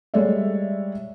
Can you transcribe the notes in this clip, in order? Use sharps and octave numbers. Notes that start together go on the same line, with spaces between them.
G3 G#3 A4 C#5 D5 E5